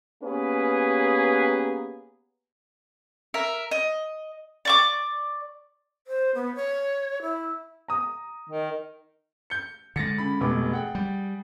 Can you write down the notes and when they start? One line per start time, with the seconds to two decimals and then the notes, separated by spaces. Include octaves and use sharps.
0.23 A#3 B3 C#4 G4 G#4 B4
3.34 A#4 E5
3.71 D#5
4.65 D5 C#6 D6
6.07 C5
6.35 B3
6.55 C#5
7.22 E4
7.88 A#5 D#6
8.50 D#3
9.50 G6 C#7
9.96 D3 G#3 A6 A#6 C#7
10.18 C#3 B5
10.40 F1 B2 D6
10.72 G#4 F#5 G5
10.95 G3